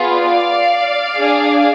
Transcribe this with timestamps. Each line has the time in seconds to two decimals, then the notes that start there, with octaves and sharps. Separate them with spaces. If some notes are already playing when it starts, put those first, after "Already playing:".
Already playing: B3 F4 G#4
0.14 D5 F5
1.18 D4 G#4